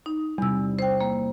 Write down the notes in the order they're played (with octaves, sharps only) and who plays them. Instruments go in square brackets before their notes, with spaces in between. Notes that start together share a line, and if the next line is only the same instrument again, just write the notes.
[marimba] D#4
[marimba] E2 E6 [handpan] C3 G3
[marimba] C5 G5
A#3